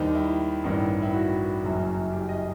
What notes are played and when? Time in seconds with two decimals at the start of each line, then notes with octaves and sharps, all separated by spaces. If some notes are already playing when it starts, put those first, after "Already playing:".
Already playing: D#2 D#3 G3 D#4 C5
0.15 E4
0.64 A1 G2 D#3
1.02 E4
1.14 F#4
1.63 F#1 F#2 F#3
2.12 G4
2.29 D#5